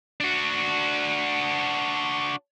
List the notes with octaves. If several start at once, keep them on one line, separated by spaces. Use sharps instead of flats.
D4 F#4